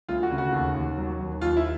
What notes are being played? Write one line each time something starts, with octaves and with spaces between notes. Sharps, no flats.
D2 F4
F#4
C#3
F#4
D#2
D#2
F#3
D#2
D#2 F4
E4